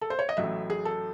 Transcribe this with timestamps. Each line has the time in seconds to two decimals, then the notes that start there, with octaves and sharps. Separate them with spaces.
0.01 A4
0.10 C5
0.19 C#5
0.29 D#5
0.37 A1 A2 F#3 E5
0.70 G#4
0.85 A4